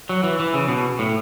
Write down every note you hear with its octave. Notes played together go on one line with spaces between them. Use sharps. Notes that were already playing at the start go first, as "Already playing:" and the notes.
F#3
E3
E3
C#3
B2
A2